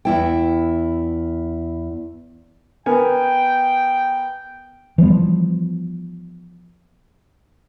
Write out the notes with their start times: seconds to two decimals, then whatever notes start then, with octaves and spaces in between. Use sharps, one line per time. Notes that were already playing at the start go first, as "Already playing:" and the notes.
0.05 E2 E4 G5
2.86 B3 A#4 G5 G#5
4.98 E3 F3 G3 B3